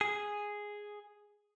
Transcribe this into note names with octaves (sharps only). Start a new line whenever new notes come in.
G#4